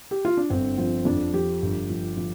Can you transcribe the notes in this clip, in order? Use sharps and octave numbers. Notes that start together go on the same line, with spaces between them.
G4
F4
D4
G1 C4
F3 C4
F2 D4
F3 G4
G1
F3
F3